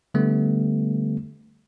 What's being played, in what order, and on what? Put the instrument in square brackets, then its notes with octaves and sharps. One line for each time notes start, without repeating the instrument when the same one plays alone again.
[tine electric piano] D3 G3 A3 B3